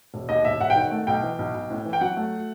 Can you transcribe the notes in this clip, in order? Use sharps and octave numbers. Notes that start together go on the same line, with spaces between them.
E1
D#2 D#5
E1 E5
E1 F#5
G5
D#3
F#5
A3
B1 G5
E3
B1
B1
A2
E3
G5
F#3 F#5
A3